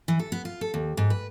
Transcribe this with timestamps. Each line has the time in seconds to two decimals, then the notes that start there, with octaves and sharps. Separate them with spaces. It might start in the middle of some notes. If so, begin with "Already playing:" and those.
0.08 E3
0.19 A4
0.32 B3
0.45 F4
0.61 A4
0.74 D#2
0.97 G#2
1.10 B4